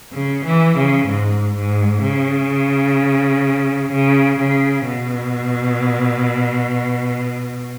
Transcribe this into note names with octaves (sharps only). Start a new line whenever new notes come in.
C#3
E3
C#3
G#2
G#2
C#3
C#3
C#3
B2